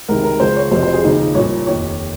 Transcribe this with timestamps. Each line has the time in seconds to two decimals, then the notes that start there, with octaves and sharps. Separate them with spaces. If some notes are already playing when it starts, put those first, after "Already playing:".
0.08 C#2 C3 D#3 A#4
0.24 A#4
0.40 C#2 C#3 F3 C5
0.56 C#5
0.71 F1 F2 C3 F3 C5
0.82 C5
0.93 G#4
1.04 D#2 C#3 F3 D#4
1.35 C2 A#2 F3 C#5
1.67 F1 D#2 D#3 C#5